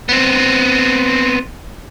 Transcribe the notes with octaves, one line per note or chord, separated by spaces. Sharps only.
B3 C4